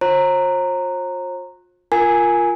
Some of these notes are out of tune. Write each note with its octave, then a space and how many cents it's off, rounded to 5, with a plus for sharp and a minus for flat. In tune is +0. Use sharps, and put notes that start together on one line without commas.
F4 +40 C5 +45 A#5 -10
F4 +0 A#4 +0 G#5 +0